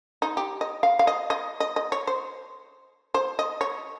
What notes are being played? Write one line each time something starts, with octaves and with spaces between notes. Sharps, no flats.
D#4
G4
D#5
F5
F5
D#5
D#5
D#5
D#5
C#5
C5
C5
D#5
C#5